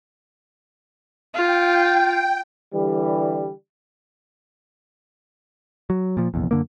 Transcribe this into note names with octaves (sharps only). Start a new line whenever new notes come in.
F4 G5
D3 E3 G3
F#3
A#2 F3
F1 A#1 E2
F#2 D3 A#3